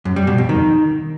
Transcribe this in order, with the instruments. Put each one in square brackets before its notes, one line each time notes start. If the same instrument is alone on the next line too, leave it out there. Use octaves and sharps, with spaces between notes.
[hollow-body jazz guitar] F#2
G3
B2
F2
D#3